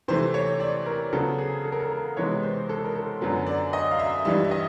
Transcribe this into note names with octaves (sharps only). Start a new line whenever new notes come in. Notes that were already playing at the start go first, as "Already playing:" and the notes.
C3 E3 A3 C5
C#5
D5
A#4
C#3 F#3 B3 A4
G#4
A4
A#4
A4
A#4
C3 E3 G#3 B3 C#5
C5
A4
A#4
A4
F#2 D3 F#3 B3
D5
D#5
F5
E5
G2 E3 G3 E5
E5
D#5